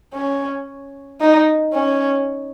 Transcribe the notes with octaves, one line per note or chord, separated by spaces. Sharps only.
C#4
D#4
C#4